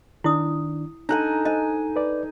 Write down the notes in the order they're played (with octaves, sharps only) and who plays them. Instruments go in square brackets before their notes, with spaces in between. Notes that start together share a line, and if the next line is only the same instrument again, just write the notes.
[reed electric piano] D#3 D4 [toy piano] E4 D#6
[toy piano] D4 [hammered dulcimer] D#4 A4 G#5 [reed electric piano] A#5 F#6
[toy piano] C5 D#5 [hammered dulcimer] G#5
[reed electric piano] B4 D5